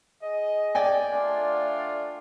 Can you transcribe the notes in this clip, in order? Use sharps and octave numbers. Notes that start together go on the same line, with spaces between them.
G#4 D#5
D5 G5 G#5
A3 D4 F4